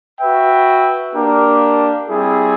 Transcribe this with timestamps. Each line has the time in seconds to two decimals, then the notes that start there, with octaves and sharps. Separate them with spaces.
0.20 F#4 B4 E5 G5
1.14 A#3 D4 G4 A#4
2.08 G3 C4 E4 G#4